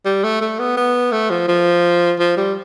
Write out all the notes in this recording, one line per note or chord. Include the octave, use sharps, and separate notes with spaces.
G3
A3
A3
B3
B3
A3
F3
F3
F3
G3